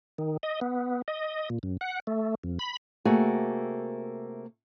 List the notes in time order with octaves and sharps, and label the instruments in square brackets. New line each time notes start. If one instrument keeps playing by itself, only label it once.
[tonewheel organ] D#3
D#5
B3
D#5
A#2
F#2
F#5
A3
F2
B5
[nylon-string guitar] C3 A3 A#3 F#4 G#4 G#5